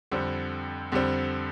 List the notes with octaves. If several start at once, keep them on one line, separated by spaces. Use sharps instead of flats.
F2 D3 G3 C4
F2 D3 G3 C4